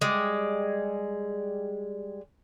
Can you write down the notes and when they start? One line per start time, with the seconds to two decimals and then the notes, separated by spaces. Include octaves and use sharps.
0.01 G3 G#3